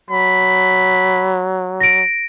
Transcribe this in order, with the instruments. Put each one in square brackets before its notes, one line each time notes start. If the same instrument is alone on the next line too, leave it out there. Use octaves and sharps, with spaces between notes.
[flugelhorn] F#3 [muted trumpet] B5
[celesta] A#6 D7